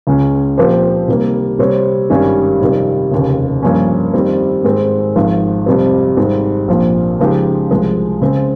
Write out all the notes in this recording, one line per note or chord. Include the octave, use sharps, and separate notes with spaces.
C#2 C#3 G#3 C#4
A#2 F3 C4 G4 C5
C3 D#3 G3 A#3
C3 G3 C4 G4 C#5
G#1 G2 D#3 G3 C#4
F2 C3 D#3 G3
F1 D#2 C#3
G2 F3 A#3 C#4
F2 D#3 G3 C4
G#2 D#3 G#3 C4
G#1 G#2 F3
F2 C3 G3 C4
G#1 G#2 G3 C4
A#1 A#2 F3 C4
C#3 F3 G#3 D#4 G4
C2 C3 F3 G#3
C#3 G#3 C4